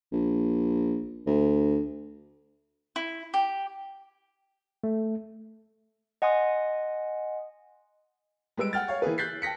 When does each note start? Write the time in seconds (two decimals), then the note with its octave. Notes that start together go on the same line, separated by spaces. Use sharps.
0.12 A#1
1.27 D2
2.96 E4
3.34 G4
4.84 A3
6.22 D#5 F#5 G#5 C6 D#6
8.57 G3 G#3 B4 E6 D7
8.73 F#5 G5 F6 A6
8.88 C#5 F5
9.02 E3 A#3 G#4 B4
9.18 F#6 G6 A6 B6 C7
9.42 G5 A5 A#6 B6 C#7